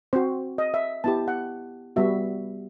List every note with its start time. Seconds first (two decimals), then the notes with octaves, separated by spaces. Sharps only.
0.13 C4 F#4 C5
0.58 D#5
0.74 E5
1.04 B3 E4 G4 A5
1.28 F#5
1.96 G3 B3 F#4 E5